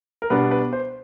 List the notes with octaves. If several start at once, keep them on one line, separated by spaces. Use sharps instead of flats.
A#4
B2 G3 B3 D4 B4
B4
C5